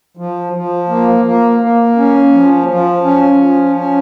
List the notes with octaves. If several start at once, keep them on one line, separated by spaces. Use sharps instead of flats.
F3
F3
A#3
A#3
A#3
C#4
F3
F3
C#4
F3
C#4